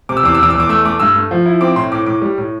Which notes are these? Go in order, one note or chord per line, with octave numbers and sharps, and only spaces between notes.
C3 D6
E6
E2 D6
E6
E2 D6
E6
E2
D6
A3 E6
A3 D6
G2 E6
A3
F3
E4
C4 D6
A2 C6
A2 D6
A2 D6
G3
A2